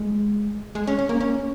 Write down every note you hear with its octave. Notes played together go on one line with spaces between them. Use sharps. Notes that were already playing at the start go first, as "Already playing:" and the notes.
Already playing: G#3
G#3
C#4
C#4
A#3
C#4